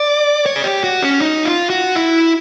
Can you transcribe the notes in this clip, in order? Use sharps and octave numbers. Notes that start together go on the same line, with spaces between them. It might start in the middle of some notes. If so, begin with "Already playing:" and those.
Already playing: D5
C#5
G#4
G4
F#4
C#4
D#4
F4
F#4
E4